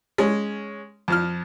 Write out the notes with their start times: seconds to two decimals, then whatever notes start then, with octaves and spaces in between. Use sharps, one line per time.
0.18 G#3 C#4
1.08 F2 F3 F6